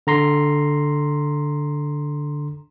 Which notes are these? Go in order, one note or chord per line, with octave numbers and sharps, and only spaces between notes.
D3 A#5 C6